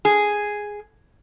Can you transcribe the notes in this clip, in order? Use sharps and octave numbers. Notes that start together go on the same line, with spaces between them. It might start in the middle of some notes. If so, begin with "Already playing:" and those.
G#4